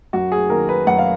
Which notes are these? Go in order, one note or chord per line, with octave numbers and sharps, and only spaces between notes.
F#2 F#4
G#4
D#3 A#3 A#4
B4
F#2 F#5
F5